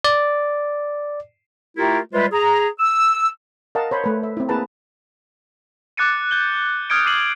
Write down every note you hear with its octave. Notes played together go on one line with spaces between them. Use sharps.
D5
A3 E4 F4 G4 A#4
G3 G#3 F4 B4 C5 E5
G#4 A#5
E6
A#4 D#5 F5 F#5 A5
C5 C#5 B5
A3 B4
E5
C4 E4
A#3 E4 G#4 B4 A5 A#5
D6 F#6 A6 C#7 D#7
G6 G7
D#6 F6 G6 G#6 C#7 D7
D6 C7 D#7 F#7